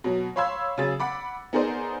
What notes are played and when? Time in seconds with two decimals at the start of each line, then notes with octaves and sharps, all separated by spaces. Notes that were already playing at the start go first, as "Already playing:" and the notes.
0.04 B2 F#3
0.36 C#5 F5 B5 C6 E6 G#6
0.78 C#3 F#3 G#4 A6
1.00 F#5 B5 D6
1.53 B3 D#4 G#4 A#4 C5 D5